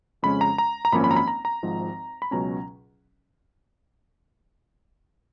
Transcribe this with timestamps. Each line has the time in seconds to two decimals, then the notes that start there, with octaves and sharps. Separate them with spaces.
0.22 F2 C#3 G#3 C#4 B5
0.41 A#5
0.58 A#5
0.85 A#5
0.92 G#1 F#2 F3 A#3 C#4 B5
1.04 B5
1.11 A#5
1.16 B5
1.28 A#5
1.45 A#5
1.63 G#1 G#2 F3
2.22 B5
2.31 C#2 B2 F#3 C#4 A#5